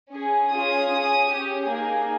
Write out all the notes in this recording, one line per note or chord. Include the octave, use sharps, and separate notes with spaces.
C#4 G#4
C#4 F4 G#4 D#6
C#4 G#4
C#4 G4
A#3 D#4 G#4